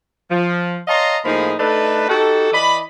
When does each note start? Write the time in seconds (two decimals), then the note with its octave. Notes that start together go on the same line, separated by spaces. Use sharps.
0.30 F3
0.87 C#5 D#5 F5 A5 A#5 C6
1.24 A2 F3 A#3 D#4 G#4 B5
1.58 A3 D4 D#4 A4 B4
2.08 D#4 F#4 G4 A4
2.52 E3 D5 D#5 B5